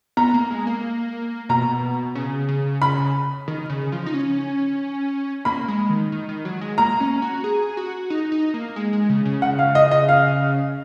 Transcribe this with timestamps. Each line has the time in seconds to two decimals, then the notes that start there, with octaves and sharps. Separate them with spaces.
0.17 B3 A#5
0.34 A#3
0.50 G#3
0.67 A#3
1.49 B2 A#5
2.15 C#3
2.49 C#3
2.82 C#3 B5
3.48 D#3
3.70 C#3
3.92 F3
4.06 D#4
4.14 C#4
5.45 A#3 B5
5.68 G#3
5.90 D#3
6.12 D#3
6.29 D#3
6.45 F#3
6.61 G#3
6.78 A#3 A#5
7.00 C#4
7.22 F#4
7.44 G#4
7.77 F#4
8.10 D#4
8.32 D#4
8.54 A#3
8.76 G#3
8.93 G#3
9.09 C#3
9.25 C#3
9.42 F#5
9.59 F5
9.75 D#5
9.91 D#5
10.08 F5